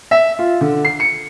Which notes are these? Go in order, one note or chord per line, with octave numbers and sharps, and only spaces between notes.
E5
F4
D3
C7
C#7